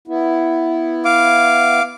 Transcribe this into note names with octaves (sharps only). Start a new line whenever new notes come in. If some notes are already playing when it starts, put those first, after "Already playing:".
B3 E4
F5 D6